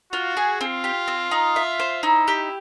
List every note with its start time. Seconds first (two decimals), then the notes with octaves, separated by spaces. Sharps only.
0.13 F4 F#4
0.37 G#4
0.61 C4 F4
0.84 G4
1.08 C4
1.31 D#4
1.56 E5
1.80 C5
2.03 D#4 E4
2.28 G4